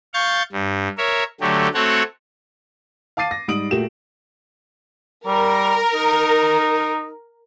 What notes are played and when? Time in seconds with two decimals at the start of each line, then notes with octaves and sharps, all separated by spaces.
0.14 F5 C#6 G6 A6
0.52 G2
0.98 A#4 C#5 E5
1.41 D3 F#3 A3 G4
1.74 A3 C4 F#4 A4 C#5 F#5
3.17 F5 A5 D6 A6 C7 D#7
3.31 A#6
3.48 G#2 G3 D#6 D7 F#7
3.71 A#2 A3 F#4 G4 E7
5.27 G3 A#4
5.95 D#4